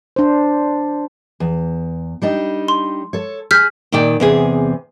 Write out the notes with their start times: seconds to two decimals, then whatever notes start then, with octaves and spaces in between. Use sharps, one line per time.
0.16 D4 C5
1.40 E2
2.22 G3 D4 D#4
2.68 C6
3.13 A4 C#5
3.51 G#4 F6 G6 B6
3.92 A#2 D#3 D5 G5
4.20 E2 C3 G#4